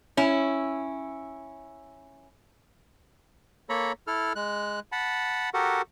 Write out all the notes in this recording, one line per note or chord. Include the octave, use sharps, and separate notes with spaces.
C#4 E4
A#3 A4 C#5 A#5 B5
E4 A4 F6
G#3 F#6
F#5 A5 B5
F#4 G4 A4 A#4 F#5